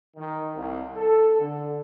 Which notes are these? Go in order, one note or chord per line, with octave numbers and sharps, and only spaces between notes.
D#3
C2
A4
D3